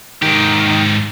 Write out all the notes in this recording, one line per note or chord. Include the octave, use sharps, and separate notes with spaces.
G#2 D#3 G4